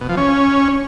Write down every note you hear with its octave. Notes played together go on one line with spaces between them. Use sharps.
B2
F3
C#4